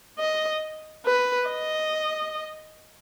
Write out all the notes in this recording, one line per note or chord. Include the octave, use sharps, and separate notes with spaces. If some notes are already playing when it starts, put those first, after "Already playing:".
D#5
B4
D#5